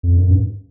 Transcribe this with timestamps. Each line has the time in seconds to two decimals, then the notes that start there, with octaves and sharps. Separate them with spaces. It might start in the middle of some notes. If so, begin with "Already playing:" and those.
0.03 F2
0.17 F#2
0.31 G2